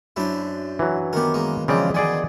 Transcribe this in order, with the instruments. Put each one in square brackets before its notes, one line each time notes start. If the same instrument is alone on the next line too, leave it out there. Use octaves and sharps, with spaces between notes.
[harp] F#2 D4 [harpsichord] E4 C5
[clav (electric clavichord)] E3 F#3
[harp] D#3 B3 [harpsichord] G4 A#4
[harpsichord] G#3 A#3
[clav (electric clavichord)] C#3 C4 D5 [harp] E3 [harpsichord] F3 G#3
[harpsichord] B2 D#3 [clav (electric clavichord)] G#4 D5 G#5